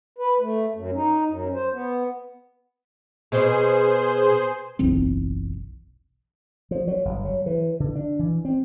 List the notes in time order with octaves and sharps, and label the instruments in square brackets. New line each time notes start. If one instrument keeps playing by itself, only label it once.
[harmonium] B4
A3
F#2
D#4
F#2
C5
B3
[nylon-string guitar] B2 [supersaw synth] G#4 C5 C6
[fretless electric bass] F#1 B1 E2 C4
[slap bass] F3
F#3
G1
F#3
E3
D3
D4
E3
C4